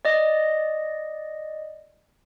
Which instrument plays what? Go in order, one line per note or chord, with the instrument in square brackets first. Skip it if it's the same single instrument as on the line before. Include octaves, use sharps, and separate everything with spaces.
[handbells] D5 D#5